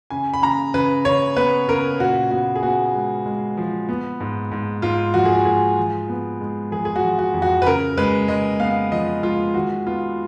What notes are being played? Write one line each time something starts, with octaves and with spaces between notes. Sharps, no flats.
C#3 G#5
B5
C#3 A#5
C#3 B4
C#3 C#5
B3 B4
C#3 A#4
A#2 F#4
B3 F#4
G#4
B3 F#4
G#3
G#3
F3
B3
G#2
G#2
G#2 F4
F3 F#4
G#4
F#4
G#2 G#4
F3
B3
G#3
F3 G#4
G#4
F#4
F3
F#4
F2
F#4
B4
C#3 A#4
G#3 B4
G#3 D#5
B3 F5
F3 D#5
G#3 F4
D#3 F#4
B3 F4